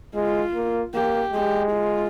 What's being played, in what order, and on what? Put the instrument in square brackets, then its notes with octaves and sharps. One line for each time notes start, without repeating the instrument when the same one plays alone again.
[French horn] G#3 [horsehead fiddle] F4
[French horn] A#3
[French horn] A#3 [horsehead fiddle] G4
[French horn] G#3 [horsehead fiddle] G4
[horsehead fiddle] F4